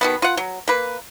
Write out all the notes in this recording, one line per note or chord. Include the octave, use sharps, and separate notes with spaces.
B2 D#3 B3
F4 F#5
F#3
A#3 B4